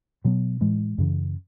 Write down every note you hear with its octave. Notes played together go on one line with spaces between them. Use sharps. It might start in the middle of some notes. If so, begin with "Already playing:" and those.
B2 F#3 B3
A2 E3 G#3
F#2 C#3 E3